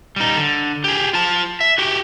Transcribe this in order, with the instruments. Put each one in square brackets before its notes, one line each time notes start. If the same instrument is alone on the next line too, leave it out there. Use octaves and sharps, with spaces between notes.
[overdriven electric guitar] G3 D#4
D3
G4 G#4
F4 A5
E5
F#4 G4